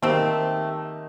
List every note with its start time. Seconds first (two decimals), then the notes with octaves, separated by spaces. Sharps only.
0.02 D#3 A3 A#3 C4 D#4 G4 A#4